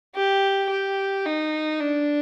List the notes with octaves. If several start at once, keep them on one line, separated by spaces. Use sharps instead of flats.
G4
G4
D#4
D4